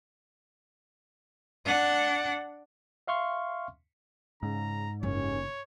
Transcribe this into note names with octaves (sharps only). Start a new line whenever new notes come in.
D4 F#5
E5 F5 C6 C#6 F6
G#2 C#3 A#5
F#1 D#2 C#4 C#5